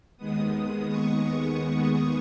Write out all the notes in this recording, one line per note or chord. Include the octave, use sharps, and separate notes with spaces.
D#2 D#3 G#3 B3 D#6
D#6
C#6